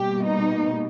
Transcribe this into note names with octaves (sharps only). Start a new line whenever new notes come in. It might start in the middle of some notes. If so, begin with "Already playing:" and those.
Already playing: B2 G3 A#3 G4
D#4